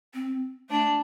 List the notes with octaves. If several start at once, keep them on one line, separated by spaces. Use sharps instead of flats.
C4
A3 D4